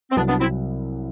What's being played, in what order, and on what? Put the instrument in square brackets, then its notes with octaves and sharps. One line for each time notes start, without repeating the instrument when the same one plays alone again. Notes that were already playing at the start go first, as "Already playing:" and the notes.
[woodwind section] C4
[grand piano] C2 C3 F#3 [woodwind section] B3 D4
[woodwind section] B3 D4
C4 E4